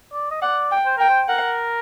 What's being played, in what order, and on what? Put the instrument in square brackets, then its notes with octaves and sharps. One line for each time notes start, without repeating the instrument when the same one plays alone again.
[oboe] D5
D#5
[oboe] D5 [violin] F#5
[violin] G5
[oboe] C5
[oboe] A#4 [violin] G5
[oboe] C5
[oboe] A#4 [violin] F#5